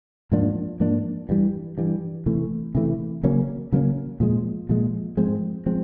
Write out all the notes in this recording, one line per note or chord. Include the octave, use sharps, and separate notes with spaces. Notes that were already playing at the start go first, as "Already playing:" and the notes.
G#2 F3 A#3 D4
G#2 F3 A#3 D4
G2 E3 G3
G2 E3 G3
C3 E3 A3
C3 E3 A3
C#3 F#3 A#3 C#4
C#3 F#3 A#3 C#4
A#2 F3 G#3
A#2 F3 G#3
G#2 F3 G#3 C4
F3 G#3 C4